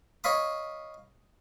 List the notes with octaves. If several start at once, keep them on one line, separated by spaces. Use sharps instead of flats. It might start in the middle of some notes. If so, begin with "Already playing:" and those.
C#5 D#5 F5 B5 D#6